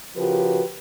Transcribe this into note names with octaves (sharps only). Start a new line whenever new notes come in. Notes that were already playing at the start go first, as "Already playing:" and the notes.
C#3 F3 F#4 G4 A#4 B4